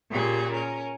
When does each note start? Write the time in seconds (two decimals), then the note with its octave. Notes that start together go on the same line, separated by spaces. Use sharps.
0.11 A#2 C#3 G4 G#4
0.54 C#4 A#4